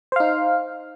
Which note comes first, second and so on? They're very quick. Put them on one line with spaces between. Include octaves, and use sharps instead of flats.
C5 F5 D#4